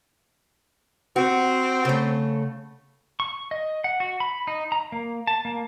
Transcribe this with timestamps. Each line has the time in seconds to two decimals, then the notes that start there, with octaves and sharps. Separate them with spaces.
1.16 C4 F#4
1.85 C#3 A3
3.20 C#6
3.51 D#5
3.84 F#5
4.00 F#4
4.20 B5
4.47 D#4
4.72 A#5
4.92 A#3
5.27 A5
5.45 A#3